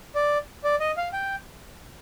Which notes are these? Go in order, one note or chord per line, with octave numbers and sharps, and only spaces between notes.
D5
D5
D#5
F5
G5